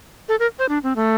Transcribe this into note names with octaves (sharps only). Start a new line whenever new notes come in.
A4
A#4
C5
D4
C4
A3